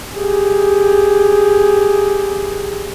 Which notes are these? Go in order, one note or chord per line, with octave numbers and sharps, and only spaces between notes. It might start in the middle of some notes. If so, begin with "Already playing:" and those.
G4 G#4